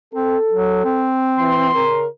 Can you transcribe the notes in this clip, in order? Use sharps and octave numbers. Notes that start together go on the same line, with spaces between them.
C4 A4
F#3
C4
E3 C6
C#3 A#4